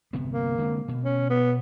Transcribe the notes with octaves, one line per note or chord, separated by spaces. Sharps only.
G1 C3 B3
A#3
D3 G#3 C4
B2
C#4
B3